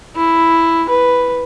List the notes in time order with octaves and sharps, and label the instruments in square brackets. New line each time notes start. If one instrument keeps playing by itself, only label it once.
[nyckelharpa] E4
B4